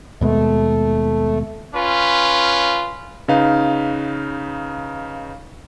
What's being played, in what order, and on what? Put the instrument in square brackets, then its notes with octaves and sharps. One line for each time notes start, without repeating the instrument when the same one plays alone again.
[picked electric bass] D#2 B2 G#3 [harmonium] A3
[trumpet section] C#4 F4 B4
[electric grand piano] C#3 D#4 B4 F5